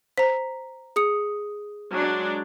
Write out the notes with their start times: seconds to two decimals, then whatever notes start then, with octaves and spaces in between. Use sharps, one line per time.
0.18 C5 A#5 B6
0.96 G#4 D#6 C#7
1.91 F#3 G#3 D4